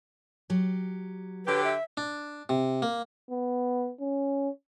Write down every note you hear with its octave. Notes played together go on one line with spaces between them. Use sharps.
F#3 G4
D3 F#3 G4 B4
E5
D4
C3
A#3
B3
C#4